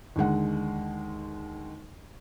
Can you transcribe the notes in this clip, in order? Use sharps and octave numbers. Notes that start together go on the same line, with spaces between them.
D#2 D3 G#3 F#5